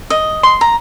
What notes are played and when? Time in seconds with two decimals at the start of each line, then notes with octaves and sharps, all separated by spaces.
0.10 D#5
0.43 C6
0.61 A#5